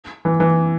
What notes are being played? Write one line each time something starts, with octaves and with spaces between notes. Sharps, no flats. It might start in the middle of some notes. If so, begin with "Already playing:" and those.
E3
E3